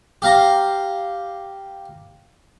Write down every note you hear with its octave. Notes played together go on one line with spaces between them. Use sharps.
G4 F5 A#5